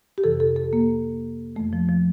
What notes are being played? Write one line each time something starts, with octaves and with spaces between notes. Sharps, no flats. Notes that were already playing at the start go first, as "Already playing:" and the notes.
G4
F2 C3 E3 A4
A4
A4
A#3
F2 E3 A3
F3
F3